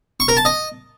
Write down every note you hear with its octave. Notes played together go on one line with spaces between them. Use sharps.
C#6
A#4
A5
D#5